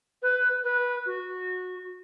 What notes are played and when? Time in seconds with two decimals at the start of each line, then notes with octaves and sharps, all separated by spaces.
0.22 B4
0.63 B4
1.06 F#4